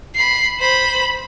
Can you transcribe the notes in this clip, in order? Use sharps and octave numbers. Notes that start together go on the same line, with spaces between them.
B5 C7
C5 B5